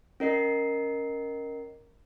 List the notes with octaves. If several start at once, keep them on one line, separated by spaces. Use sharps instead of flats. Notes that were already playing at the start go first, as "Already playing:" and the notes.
C#4 A#4 D#5 C7